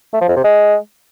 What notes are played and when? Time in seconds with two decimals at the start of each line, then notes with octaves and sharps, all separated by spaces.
0.13 A3
0.21 F3
0.28 F2
0.36 C3
0.44 G#3